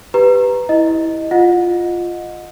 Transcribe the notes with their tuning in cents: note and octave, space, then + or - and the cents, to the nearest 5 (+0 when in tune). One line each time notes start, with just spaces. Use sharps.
G4 +0 B4 +5 A#5 +0
E4 -15 D#5 +0
F4 +0 D#5 +0 F#5 -30